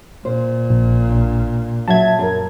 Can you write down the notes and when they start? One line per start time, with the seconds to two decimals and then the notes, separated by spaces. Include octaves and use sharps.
0.25 A#2 C5
0.70 A#1
1.09 D4
1.88 F#3 E5 A5 G#6
2.19 F#2 A#4